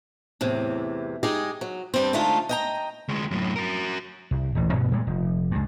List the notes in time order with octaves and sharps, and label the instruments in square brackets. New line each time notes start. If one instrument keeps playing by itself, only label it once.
[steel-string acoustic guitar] E2 A2 C3
G#3 D#4 G4 G#4
F#3
G2 G3 C4
D3 G#3 A3 D#4 F4
D#5 G5 A#5
[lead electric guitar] D2 G#3
F#2 A2
F#4 A#4
[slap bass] C2
D#1 A1
D2 G2 B2 B3
A#2 G3 G#3
F1
C#2 G2